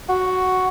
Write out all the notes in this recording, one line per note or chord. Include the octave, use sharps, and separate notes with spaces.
F#4